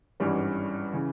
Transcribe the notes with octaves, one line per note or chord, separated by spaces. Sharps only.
G#1 G2 E3 G3 C#4
C#3 E3